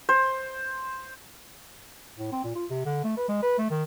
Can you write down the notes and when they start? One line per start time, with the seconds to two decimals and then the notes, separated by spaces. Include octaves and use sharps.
0.09 C5
2.18 A2
2.32 C4
2.44 A#2
2.56 F4
2.70 C3
2.85 D3
3.04 A3
3.17 B4
3.29 G#3
3.42 B4
3.58 A3
3.70 D#3